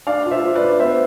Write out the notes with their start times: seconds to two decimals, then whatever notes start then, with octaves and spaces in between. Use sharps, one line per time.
0.07 D4 D5 F5
0.26 F4
0.31 C5 E5
0.44 F4
0.55 B4 D5
0.62 D4
0.79 B3 C5 E5